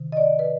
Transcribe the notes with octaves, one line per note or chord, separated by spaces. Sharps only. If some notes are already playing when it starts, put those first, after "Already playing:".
Already playing: C3 D#3
D#5
D5
B4